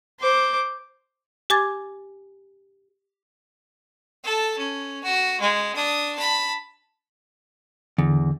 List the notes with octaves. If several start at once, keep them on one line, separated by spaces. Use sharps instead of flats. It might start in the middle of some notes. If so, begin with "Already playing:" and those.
C5 D6
G4 G#5 D6 G#6 A6
A4 A5
C#4
F#4
G#3
D4 D#6
A5 B5
E2 D3